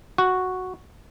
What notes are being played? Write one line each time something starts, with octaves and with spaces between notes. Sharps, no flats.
F#4